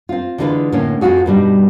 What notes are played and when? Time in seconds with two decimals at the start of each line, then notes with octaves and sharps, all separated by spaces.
0.09 C4 F4
0.38 D3 E3 G#3 C4 F4 B4
0.72 A2 D3 A#3 C4 C#4
1.01 F2 C4 F4 F#4 G#4
1.26 G2 B2 G3 D#4